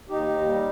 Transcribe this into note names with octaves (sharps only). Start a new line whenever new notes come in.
D#2 D#4 G4
D#2
G3